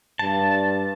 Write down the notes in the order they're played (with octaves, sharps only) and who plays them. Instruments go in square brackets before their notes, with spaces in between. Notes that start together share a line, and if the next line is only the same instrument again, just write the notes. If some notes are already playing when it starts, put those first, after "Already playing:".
[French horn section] G2 [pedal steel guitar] A5